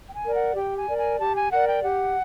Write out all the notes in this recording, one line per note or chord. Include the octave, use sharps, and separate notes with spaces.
G5
G#5
A#4 D5
F#5
G4 G5
G#5
A#4 D5
G#5
G4 A5
G#5
A#4 D5 F#5
G5
G4 F#5